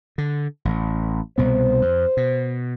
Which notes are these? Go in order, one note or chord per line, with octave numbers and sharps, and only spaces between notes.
D3
A1
C2 B2 B3 C5
F2
B2